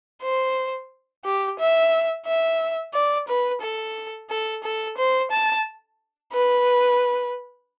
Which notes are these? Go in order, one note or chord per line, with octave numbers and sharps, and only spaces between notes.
C5
G4
E5
E5
D5
B4
A4
A4
A4
C5
A5
B4